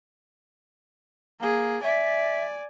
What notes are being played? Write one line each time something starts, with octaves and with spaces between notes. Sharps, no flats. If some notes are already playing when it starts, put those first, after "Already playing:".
A#3 G#4
D5 E5 G#5